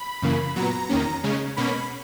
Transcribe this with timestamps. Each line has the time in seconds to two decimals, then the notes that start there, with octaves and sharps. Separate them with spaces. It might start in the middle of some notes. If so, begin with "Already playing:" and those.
Already playing: B5
0.22 F#2 C#3 E3 A#3
0.56 A#2 F#3 B3 A#5
0.89 E2 D#3 A#3 C#4
1.23 C#3 G#3 C#4
1.57 B2 A#3 C#4 B5